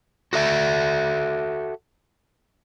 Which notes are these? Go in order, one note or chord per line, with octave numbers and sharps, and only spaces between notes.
F#4 A4 E5